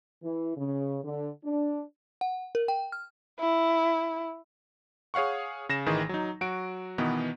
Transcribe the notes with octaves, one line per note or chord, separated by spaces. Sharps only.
E3
C#3
D3
D4
F#5
A#4
G5
F6
E4
G#4 C#5 F5 F#5 C#6
C#3 A#6 E7
A1 D#3 E3 G#4
F#3 D#4
F#3 F#4 D7
B2 D#3 E3 B3